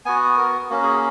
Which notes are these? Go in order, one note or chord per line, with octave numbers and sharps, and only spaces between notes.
B3 F#4 G#5
A#4
A#3 C#4 F#4
G#4